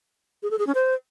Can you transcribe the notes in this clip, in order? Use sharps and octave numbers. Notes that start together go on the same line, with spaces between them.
G#4
A4
G#4
C#4
C5